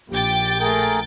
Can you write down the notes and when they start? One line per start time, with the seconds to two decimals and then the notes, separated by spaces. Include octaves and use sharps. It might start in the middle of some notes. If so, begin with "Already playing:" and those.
0.11 A#1 G4 G5 A6
0.60 A3 G#4 A#4